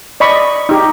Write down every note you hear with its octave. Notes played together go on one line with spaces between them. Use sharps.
D5 D#5 B5 C#6
D#4 G4